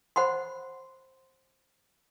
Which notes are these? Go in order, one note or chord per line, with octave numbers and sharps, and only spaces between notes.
C5 F#5 B5 C6